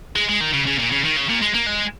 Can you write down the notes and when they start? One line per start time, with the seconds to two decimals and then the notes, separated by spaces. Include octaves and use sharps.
0.16 G#3
0.29 G#3
0.40 D#3
0.53 C#3
0.66 C#3
0.79 A#2
0.91 C#3
1.04 D#3
1.16 C#3
1.29 A#2
1.42 G#3
1.54 A#3
1.66 G#3